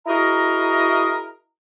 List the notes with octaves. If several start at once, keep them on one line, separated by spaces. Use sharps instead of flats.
E4 F#4 G#4 A#4 D#5 A#5